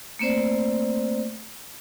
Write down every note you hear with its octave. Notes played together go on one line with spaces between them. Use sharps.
A3 A#3 C4 C5 D5